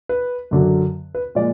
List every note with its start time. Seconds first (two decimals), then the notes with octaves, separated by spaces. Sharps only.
0.09 B4
0.51 F#2 D3 F#3
1.15 B4
1.35 A#2 F3 G#3 D5